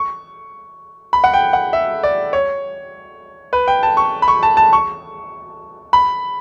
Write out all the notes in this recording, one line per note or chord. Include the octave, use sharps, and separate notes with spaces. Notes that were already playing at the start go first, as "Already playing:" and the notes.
Already playing: C#6
B5
F#5
G5
F#5
E5
D5
C#5
B4
G5
A5
C#6
B5
C#6
A5
A5
C#6
B5